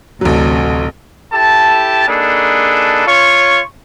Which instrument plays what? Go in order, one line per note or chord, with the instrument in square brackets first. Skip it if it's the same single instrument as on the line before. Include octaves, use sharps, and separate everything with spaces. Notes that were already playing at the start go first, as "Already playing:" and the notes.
[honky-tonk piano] A1 F#3 [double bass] D2 [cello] C3 A4
[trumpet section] E4 G4 A4 A5
A#3 D4 D#4 G#4 A4 B4
F4 C#5 C#6